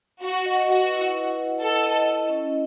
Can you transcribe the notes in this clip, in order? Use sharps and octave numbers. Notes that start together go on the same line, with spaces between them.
F#4 F#5
D#5
F#4 B4
E4
B4
E4
A4 D#5
D#5
E4
C#4